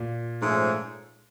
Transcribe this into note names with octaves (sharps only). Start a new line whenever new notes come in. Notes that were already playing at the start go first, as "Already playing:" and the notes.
Already playing: A#2
G#2 F3 A3 C#4